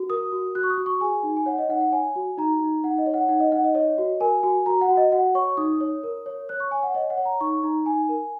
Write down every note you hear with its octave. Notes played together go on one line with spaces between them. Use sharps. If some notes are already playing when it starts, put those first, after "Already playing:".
Already playing: F#4
A#4 D#6
F#4
F#4 F#6
C#6
D#6
F#4
C#6
G#4 G#5
D#4
G#5
C#5 F#5
D#5
D#4 F#5
F#5
C#5 G#5
F#4
D#4 A#5
D#4
D#4 F#5
D#5
C#5
F#5
D#4 F#5
D#5
D#4 F#5
D#5
C#5 D#5
F#4
A#4 G#5
F#4 G#5
F#4 A#5
F#5
F#4
D#5
F#4 F#5
C#5 C#6
D#4 D#6
C#5
A#4
C#5
C#5 F#6
C#6
C#5 G#5
F#5
C#5 D#5
F#5
C#5
A#5
D#4 C#6
D#4 A#5
D#4 G#5
A#4